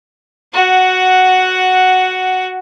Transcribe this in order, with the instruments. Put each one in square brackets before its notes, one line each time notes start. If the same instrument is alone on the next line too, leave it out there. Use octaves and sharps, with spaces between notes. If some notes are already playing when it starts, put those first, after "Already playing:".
[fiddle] F#4 F#5